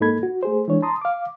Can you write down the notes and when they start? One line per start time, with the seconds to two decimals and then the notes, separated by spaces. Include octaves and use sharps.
0.01 G#2 A#3 D#4 A4 B5 G#6
0.23 F#4
0.43 A3 G#4 C5
0.68 E3 G#3 D4 C#5
0.82 A5 A#5 C6 D#6
1.01 F5 D6